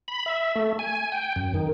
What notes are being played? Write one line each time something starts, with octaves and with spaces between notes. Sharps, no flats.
B5
E5
A3
G#5
G5
F#2
D#3